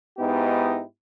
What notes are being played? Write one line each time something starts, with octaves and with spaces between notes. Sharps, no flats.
G#2 B3 D#4 E4 G4